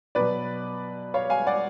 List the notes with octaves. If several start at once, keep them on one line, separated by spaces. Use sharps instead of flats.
B2 F#3 B4 D5
C#5 F5
F5 G#5
D5 F#5